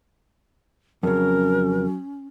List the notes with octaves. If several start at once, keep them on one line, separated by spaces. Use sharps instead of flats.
F2 C#3 F#3 C#4 A#4